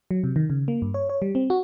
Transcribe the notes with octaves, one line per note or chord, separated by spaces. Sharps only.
F#3
C3
D#3
C#3
A#3
G2
C#5
C#5
G3
C4
F#4